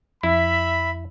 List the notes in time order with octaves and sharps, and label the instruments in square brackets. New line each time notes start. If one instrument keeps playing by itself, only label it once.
[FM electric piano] F2 [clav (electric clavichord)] E4 [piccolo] E5 [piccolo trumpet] B5